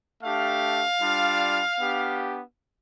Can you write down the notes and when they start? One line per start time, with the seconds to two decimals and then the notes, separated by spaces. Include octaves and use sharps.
0.23 A3 D4 G4 F5
1.01 G3 D4 F4
1.79 B3 D4 G4